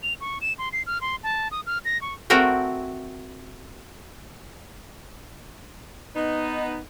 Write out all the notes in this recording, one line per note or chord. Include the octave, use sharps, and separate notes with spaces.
F7
C#6
E7
C6
C7
F6
C6
A5
D#6
F6
A#6
C#6
A3 C4 F#4 A#4 G5
B3 D#4